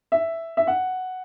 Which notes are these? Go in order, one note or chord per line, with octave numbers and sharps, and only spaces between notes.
E5
E5
F#5